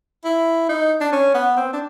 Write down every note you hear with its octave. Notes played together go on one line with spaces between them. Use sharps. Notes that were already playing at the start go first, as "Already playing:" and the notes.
E4
D#4
D4
C#4
B3
C4
D4